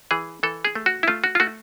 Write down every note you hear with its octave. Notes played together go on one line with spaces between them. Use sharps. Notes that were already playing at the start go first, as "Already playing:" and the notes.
E3 G#4
E3 A4
G#4
A3
F#4
E4
A3 F4
F#4
F4
A3 F#4